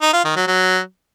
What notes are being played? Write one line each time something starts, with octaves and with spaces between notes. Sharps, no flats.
D#4
F4
D#3
F#3
F#3